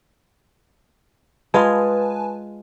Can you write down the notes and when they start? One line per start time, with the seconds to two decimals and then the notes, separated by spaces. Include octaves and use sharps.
1.54 G#3 F4 G#4 B4 G#5 A5